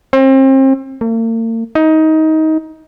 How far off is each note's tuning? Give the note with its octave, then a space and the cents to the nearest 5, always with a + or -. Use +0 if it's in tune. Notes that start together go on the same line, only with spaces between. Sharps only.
C4 +35
A#3 -45
D#4 +20